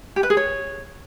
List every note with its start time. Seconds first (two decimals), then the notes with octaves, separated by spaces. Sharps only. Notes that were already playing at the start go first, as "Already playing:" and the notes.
0.16 G4
0.23 B4
0.30 G#4
0.37 C#5